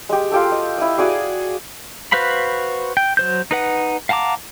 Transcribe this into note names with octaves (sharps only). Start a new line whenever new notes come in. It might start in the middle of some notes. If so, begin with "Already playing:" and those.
G#3 G4
F4 G4 A4
D#5
E4 D#5
F#4 G#4 D5 F5
F#4 B4 C5 F5 B5
G5
F#3 C5 G6
D#4 B4 F#5
F5 F#5 A5 A#5 D6